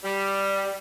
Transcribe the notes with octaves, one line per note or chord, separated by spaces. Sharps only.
G3